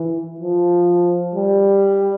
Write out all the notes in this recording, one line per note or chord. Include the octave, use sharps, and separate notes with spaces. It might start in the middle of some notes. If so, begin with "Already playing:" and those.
Already playing: E3
F3
G3